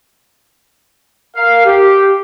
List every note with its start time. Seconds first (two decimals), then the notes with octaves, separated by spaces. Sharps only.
1.36 A#4 F5
1.65 G4